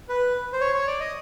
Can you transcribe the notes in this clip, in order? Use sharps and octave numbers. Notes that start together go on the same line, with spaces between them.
B4
C5
C#5
C#5
D5
D#5